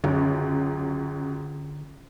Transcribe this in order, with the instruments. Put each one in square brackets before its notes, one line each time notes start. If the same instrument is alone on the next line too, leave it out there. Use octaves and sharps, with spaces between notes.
[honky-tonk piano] C#2 F#2 [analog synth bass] D3